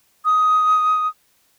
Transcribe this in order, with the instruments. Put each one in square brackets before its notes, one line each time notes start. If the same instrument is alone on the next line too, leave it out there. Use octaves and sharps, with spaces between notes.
[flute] D#6